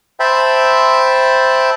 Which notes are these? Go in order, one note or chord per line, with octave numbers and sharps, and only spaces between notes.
C5 E5 G5 A5 B5